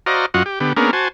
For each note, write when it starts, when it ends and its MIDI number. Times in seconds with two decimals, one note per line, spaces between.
0.06 0.26 66
0.06 0.26 72
0.06 0.26 74
0.06 0.26 75
0.06 0.26 77
0.06 0.26 82
0.34 0.43 42
0.34 0.43 65
0.34 0.43 66
0.34 0.43 75
0.34 0.43 78
0.46 0.60 67
0.60 0.73 50
0.60 0.73 59
0.60 0.73 67
0.77 0.91 58
0.77 0.91 59
0.77 0.91 61
0.77 0.91 62
0.77 0.91 68
0.77 0.91 70
0.93 1.08 66
0.93 1.08 72
0.93 1.08 80
0.93 1.08 81